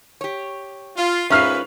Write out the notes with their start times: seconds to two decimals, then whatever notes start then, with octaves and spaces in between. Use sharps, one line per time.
0.21 G4 C#5
0.97 F4
1.30 G#2 C#4 F4 A#4 B4 E5 F6 C7